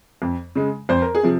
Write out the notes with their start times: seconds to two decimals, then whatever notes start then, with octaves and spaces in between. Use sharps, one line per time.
0.22 F2
0.55 C#3 G#3
0.89 F2 C5
1.02 A#4
1.15 G#4
1.23 C3 F3